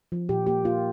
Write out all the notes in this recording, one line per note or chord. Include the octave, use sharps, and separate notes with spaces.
F3
A#2 G4
A#3 G4
A#3 F4